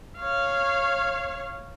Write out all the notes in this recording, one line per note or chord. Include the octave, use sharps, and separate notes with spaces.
C#5 F5